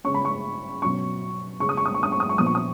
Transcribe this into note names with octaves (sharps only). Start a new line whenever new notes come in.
C#3 G#3 C#4 C#6
B5
C#6
B2 F#3 C#4 C#6
C#3 G#3 C#4 C#6
D#6
C#6
D#6
C#6
D#6
C#6
D#6
C#6
A#2 F3 B3 D#6
C#6
D#6